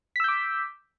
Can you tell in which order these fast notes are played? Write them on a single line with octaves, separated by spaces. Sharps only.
B6 E6 G6 D6